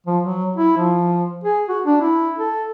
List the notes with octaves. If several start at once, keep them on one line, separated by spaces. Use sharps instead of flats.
F3
F#3
E4
F3
G#4
F#4
D4
E4
A4